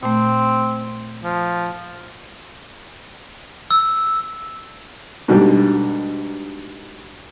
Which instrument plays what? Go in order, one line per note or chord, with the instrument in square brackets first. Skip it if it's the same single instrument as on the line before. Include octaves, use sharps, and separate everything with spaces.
[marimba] A#2 A3 [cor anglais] C4
[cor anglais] F3
[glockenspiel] E6
[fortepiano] G#2 B2 D3 G3